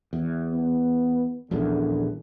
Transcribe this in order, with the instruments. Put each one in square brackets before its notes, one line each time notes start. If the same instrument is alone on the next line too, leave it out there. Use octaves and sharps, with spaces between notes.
[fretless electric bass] E2
[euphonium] B3
[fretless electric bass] D#1 A#1 E2 [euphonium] D3